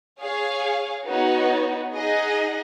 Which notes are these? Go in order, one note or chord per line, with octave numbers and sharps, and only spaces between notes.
G#4 C#5 F5
B3 D#4 F#4 C#5
D#4 G#4 D#5 F#5